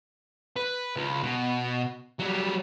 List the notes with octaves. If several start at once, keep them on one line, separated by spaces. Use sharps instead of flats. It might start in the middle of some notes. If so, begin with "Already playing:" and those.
B4
C#2
B2
F#3 G3